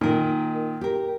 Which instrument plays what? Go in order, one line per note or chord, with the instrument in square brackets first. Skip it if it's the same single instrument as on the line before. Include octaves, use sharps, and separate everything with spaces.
[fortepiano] A#2 D#3 [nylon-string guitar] D#4 A#4
[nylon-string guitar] G4 A#4